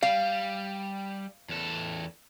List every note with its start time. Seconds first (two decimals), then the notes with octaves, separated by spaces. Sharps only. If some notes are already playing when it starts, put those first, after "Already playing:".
0.03 G3 F5
1.49 E2 A4